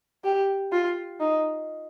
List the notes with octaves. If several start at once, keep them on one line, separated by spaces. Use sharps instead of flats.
G4
F4
D#4